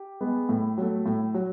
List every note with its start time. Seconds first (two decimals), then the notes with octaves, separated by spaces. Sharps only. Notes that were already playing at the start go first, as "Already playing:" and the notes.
Already playing: G4
0.21 G#3 B3
0.49 A2
0.78 F#3 A3
1.06 A2
1.34 F#3